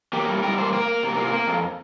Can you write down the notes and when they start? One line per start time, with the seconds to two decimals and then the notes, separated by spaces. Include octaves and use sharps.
0.13 A#3 G4
0.29 G3
0.43 G3 A#4
0.58 A#3 C5
0.73 A#3 A#4
0.88 A#3
1.03 C3
1.18 A#3
1.33 A#3
1.48 F2